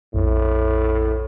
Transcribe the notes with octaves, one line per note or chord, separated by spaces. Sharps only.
A#1 F2 A2